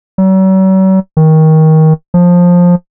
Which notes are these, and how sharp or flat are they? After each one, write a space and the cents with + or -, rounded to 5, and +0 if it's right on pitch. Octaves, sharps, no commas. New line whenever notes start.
F#3 +45
D#3 +20
F3 +15